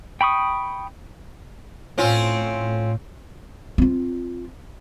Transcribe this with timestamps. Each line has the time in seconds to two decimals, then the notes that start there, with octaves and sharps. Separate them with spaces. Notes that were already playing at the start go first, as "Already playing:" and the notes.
0.21 G5 B5 C#6 D#6
1.98 A2 C4 C#4 F4
3.78 C4 F4